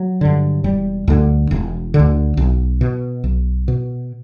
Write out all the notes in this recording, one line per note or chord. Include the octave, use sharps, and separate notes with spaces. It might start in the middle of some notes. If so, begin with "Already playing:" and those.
Already playing: F#3
G2 D3
E1 G3
D2 D3
E1
D3
D2
B1
B2
B1
B2